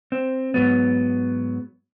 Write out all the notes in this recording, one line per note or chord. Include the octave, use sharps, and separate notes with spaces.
C4
G#2 F#3 B3